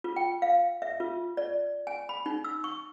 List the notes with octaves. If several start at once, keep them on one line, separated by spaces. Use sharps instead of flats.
F4
G5
F5
E5
F4
D5
G#5
B5
D#4
E6
C#6